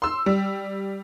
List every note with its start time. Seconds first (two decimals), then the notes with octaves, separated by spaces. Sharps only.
0.02 C6 E6
0.26 G3